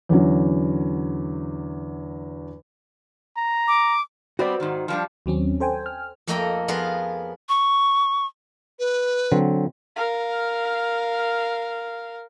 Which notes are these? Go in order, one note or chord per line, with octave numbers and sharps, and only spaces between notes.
E2 D3 F#3 C#4
A#5
D6
G3 B3 C4 F#4 C5 D5
G#2 D#3
F3 G3 D4
D#2 F#3 C4 C#4
A4 C5 G5 G#5
F6
F2 A3 A#3 D#5 G5 A#5
F3 B3 F4 G#4 A#4 B4
C#6
B4
D3 F#3 C4
A#4 F5